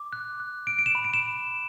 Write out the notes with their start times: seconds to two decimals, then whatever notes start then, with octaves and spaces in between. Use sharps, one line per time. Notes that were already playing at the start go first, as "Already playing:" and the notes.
Already playing: D6
0.13 F#6
0.40 F#6
0.67 F#6 D7
0.79 D7
0.86 E7
0.95 B5
1.04 D7
1.14 E7